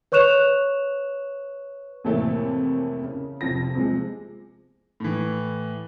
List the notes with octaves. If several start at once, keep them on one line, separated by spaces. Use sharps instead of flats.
B4 C#5 C#6 F#6 E7 F7
F2 A2 C3 E3 A3 A#3
C#3
F1 F2 F3 A#6
C3 F3 G#3 G#4
A2 E3